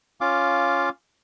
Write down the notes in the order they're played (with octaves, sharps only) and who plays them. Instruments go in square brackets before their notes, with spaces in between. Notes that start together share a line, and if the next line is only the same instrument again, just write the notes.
[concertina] C#4 F4 F5 D6